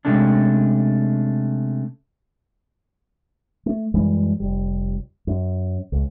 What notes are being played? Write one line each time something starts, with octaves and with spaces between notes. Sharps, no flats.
C3 G#3 A3 C#4 D4
A3
F#2 E3 G3 G#3
F1 G3
F#2
C#2